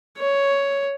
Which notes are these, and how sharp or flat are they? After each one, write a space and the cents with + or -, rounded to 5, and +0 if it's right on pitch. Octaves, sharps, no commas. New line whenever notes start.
C#5 +5